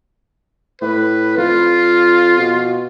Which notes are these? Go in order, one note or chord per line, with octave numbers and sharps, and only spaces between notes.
A2 B4
F2 F4
B2